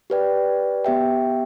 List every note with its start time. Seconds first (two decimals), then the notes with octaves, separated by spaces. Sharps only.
0.10 G4 B4 D5 G5
0.84 B3 G4 E5 G5